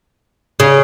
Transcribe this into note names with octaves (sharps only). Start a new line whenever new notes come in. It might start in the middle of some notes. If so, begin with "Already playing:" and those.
C#3